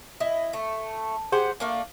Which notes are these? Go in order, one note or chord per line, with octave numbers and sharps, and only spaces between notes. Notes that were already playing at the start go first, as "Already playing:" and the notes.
E4 D#5
A3
G4 G#4 C5 F#5
A3 A#3 D4